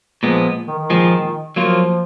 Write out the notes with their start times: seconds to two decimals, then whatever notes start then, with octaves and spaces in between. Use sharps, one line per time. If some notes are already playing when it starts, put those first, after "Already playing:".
0.23 A#2 F3 G#3 B3
0.68 D#3
0.79 D#3
0.90 A#2 F3 G#3
1.56 F3 F#3 A#3 F4